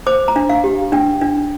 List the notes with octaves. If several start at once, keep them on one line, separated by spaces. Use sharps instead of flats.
C5 D6
A#5
D4
F5
G4
D4 G5
D4